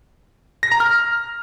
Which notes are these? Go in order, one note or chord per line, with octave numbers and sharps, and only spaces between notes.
A#6
A#5
F6